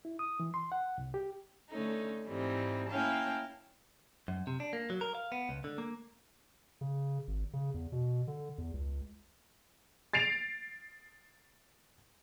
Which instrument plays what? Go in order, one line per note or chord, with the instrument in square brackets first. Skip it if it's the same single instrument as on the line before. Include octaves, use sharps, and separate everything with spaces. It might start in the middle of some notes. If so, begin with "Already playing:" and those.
[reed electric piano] E4
D#6
E3
C6
F#5
C2
G4
[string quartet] D3 A3 C#4 D#4
G#2 E3 G3 C4 D#4
A#3 C#4 E4 F5 G5 A5
[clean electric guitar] F#2
C3
D4
A#3
F#3
A#4
F5
B3
C#2
D3
A#3
[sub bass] C#3
G#1
C#3
E2
B2
D3
E2
C#2
[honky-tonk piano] A6 C7 D7 F7